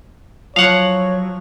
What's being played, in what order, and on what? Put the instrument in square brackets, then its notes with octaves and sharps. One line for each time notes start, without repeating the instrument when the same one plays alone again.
[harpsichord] F3 [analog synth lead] F#3 [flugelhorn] C#5 [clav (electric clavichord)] F5 F#5